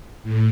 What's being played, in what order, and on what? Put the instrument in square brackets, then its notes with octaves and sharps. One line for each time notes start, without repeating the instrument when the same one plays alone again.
[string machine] A2